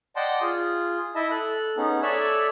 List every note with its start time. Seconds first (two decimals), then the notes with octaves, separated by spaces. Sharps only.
0.16 D5 D#5 F#5 G5 A5 C6
0.42 F4 G#4
1.15 E4 D#5 E5 A5
1.31 A4 F#6
1.77 B3 C#4 D#4 G#4
2.02 A4 C#5 D5 E5 E6 F#6